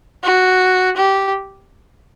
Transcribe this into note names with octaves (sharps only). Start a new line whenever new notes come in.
F#4
G4